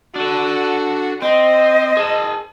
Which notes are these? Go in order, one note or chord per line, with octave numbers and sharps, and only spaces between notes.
D4 F#4 A4
C4 C5 D#5
G#4 A5